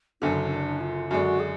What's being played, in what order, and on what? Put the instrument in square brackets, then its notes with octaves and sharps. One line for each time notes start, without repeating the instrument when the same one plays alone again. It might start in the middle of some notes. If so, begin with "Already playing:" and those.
[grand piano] F#1 F#2 D3 [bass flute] D4
[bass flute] D4
F4
[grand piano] F#2 D3 G#3 D4 [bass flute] F#4
[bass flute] G#4